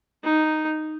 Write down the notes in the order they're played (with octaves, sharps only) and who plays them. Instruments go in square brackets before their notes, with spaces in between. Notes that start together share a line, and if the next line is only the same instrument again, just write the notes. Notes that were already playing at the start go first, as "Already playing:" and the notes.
[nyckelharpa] D#4